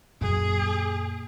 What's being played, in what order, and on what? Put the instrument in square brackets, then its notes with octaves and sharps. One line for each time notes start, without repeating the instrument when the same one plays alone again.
[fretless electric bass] F#2 [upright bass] A#2 [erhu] G#4